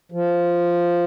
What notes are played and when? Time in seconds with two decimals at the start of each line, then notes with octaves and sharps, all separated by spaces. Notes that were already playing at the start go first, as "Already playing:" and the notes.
0.12 F3